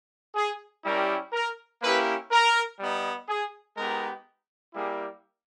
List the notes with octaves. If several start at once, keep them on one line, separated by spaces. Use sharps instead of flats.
G#4
G3 C#4 E4 G4 A#4
A#4
A#3 C#4 E4 G4 B4
A#4
G3 B3 D#4
G#4
G#3 B3 D#4 G4 A#4
G3 A#3 E4 G4 G#4